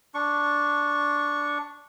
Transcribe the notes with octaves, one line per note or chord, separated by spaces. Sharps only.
D4 C#6